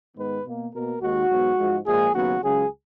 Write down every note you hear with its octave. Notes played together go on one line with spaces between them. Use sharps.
G#2 D#3 G#3 B3 B4
B2 A#3
B2 A#3 A#4
D#2 D#3 G#3 F#4
G#2 F#3 B3
G#2 F3 G#3
A#2 F3 G#3 G#4
D#2 C#3 F#3 B3 F#4
C#2 C#3 F#3 G#4